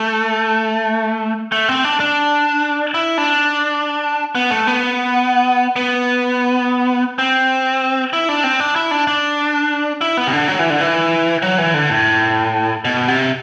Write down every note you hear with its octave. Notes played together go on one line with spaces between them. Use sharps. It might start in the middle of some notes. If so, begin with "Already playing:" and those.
Already playing: A3
A3
C4
D4
D4
E4
D4
B3
A3
B3
B3
C4
E4
D4
C4
D4
E4
D4
D4
E4
B3
C3
D3
F#3
E3
D3
E3
F#3
E3
D3
A2
B2
C3